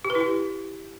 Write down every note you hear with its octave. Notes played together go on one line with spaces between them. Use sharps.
G4
B4
E4
G4